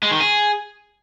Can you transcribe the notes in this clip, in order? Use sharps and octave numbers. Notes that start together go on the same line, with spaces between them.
G#3
D#3
G#4